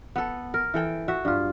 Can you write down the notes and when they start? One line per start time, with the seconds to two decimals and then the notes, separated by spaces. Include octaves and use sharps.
0.16 B3 A4
0.54 A#4
0.74 E3 A4 G5
1.08 F#4 E5
1.25 G2 F4